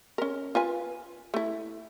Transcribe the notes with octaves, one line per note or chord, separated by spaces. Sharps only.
C#4 A#4
F4 B4 G#5
A3 E4